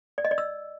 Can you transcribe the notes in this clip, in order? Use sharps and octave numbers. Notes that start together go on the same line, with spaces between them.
D5
D#5
D5
E6